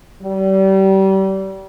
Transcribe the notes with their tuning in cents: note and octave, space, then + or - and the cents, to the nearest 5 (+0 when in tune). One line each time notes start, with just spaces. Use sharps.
G3 -30